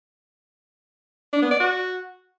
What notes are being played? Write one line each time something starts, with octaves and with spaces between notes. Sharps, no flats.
D4
B3
D5
F#4